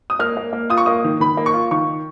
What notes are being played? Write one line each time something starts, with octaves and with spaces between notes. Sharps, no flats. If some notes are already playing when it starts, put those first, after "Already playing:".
D#6
A#3 F6
A#3
A#3
F4 D#6
C#6
A#3 D#6
D#3
D#3 B5
A#3
C#6
F4
D#3 C#6